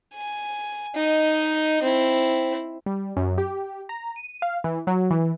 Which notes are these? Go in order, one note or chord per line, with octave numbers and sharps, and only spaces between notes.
G#5
D#4 D#5
C4 E4
G3
F#2
G4
A#5
D#7
F5
E3
F#3
E3